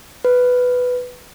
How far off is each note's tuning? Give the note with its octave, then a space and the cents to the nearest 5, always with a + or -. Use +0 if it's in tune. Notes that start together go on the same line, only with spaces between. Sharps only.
B4 +5